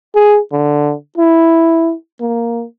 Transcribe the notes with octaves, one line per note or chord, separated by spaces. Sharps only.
G#4
D3
E4
A#3